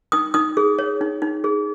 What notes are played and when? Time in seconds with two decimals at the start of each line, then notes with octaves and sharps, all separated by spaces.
0.12 D#4 D#6
0.34 D#4 D#6
0.57 G#4
0.79 C#5
1.01 D#4
1.22 D#4
1.44 G#4